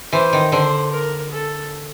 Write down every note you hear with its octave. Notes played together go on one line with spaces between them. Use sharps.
E3 C5
D#3
D3 C5
A#4
A4